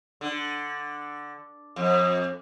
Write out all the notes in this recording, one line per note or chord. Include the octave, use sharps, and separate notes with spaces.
D3
F2